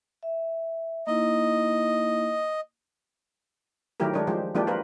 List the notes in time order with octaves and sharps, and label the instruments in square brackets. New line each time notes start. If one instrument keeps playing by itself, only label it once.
[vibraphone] E5
[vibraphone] A#3 D#4 E4 [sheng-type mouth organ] D#5
[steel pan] D#3 F#3 A3 E4 G4 A#4
G#3 D4 A#4 C#5
F3 G#3 G4 C5
F3 G#3 A#3 D4 E4 G4
F4 A#4 B4